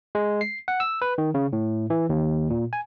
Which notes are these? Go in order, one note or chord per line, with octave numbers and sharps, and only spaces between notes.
G#3
C7
F#5
E6
B4
D#3
C#3
A2
E3
D#2
A#2
G#5